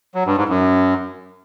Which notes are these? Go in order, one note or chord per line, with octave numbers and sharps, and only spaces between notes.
F#3
G2
G#2
F#2